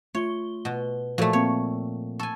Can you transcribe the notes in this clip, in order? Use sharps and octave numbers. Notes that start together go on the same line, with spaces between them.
A3 F4 C#5 G7
B2
A#2 F3 A3 F#4 A4
F3 A#3 C4 C#5
A4 G#5 C#6